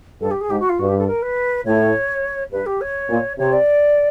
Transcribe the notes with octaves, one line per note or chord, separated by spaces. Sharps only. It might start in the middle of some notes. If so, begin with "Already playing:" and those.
G2 A4
G4
G#4
G#2 G4
F#4
F4
G2 F#4
G4
A4
A#4
B4
A2 C#5
G2 B4
G4
C#5
A#2
C3 C#5
D5